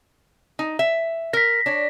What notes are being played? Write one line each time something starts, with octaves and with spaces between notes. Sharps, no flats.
D#4
E5
A#4 A#6 B6
D4 C#5